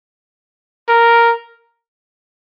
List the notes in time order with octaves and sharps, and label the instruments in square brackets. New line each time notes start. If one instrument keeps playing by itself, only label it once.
[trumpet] A#4